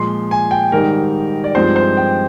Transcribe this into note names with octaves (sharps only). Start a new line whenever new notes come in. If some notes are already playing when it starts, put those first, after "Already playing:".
Already playing: A#2 F3 G#3 C6
G#5
G5
G#2 D#3 G3 A#4
D5
G2 F3 G#3 C4 D#4 C5
C5
G5